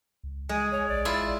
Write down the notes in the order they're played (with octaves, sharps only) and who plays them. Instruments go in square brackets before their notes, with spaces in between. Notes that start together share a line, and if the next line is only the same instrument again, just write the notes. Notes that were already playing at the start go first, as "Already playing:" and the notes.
[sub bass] C#2
[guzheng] G#3 [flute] G#5
[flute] C#5
[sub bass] A#1 [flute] D5
[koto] E4 F4 E5
[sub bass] A1